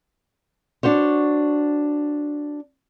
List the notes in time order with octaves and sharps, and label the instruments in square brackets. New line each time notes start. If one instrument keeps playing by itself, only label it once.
[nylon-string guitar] D4 F#4 C5 C#5